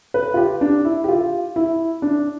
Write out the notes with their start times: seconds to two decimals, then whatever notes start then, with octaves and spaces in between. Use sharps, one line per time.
0.14 B4
0.34 F4
0.37 G4
0.61 D4
0.85 E4
1.04 G4
1.09 F4
1.56 E4
2.02 D4